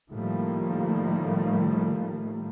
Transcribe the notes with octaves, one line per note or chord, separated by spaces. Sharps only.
A2 D#3 F3 G3 A3 A#3